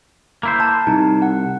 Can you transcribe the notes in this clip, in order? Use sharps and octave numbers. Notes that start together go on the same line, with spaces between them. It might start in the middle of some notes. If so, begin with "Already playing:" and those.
A#3 E4 C5
A5
C2 D#4
F#5